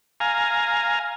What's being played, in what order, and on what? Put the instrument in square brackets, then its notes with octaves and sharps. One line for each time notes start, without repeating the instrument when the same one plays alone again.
[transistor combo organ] F5 G#5 A#5